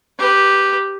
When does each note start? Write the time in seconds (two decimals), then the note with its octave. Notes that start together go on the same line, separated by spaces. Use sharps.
0.19 G4 B4